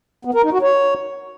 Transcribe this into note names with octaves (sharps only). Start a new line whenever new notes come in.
B3
A#4
D#4
F#4
C#5